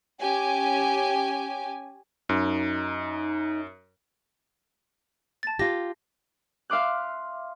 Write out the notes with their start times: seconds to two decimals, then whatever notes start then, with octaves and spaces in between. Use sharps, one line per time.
0.20 C#4 G4 G#5
2.29 F#2 D#4
5.43 A5 A6
5.59 F4 G4 A#6
6.70 E5 F5 C6 D6 F#6